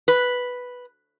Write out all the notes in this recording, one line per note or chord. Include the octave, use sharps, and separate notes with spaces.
B4